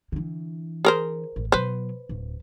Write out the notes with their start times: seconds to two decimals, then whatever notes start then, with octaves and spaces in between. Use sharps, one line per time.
0.12 D3 E3
0.85 G#4 A#4 C5
1.36 A1
1.52 B2 F#3 B4 C5
2.09 D1